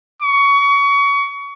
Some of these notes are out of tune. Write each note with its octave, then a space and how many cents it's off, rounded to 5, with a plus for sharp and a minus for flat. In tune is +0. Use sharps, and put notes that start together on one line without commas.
C#6 +25